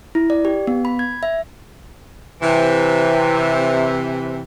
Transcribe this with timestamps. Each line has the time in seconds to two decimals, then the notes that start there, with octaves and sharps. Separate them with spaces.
0.15 E4
0.30 D5
0.45 G4
0.67 B3
0.85 B5
0.99 G#6
1.23 E5
2.42 C3 E3